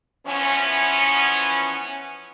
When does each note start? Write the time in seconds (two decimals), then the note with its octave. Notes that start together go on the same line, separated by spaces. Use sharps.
0.26 E3 F3 B3 C#4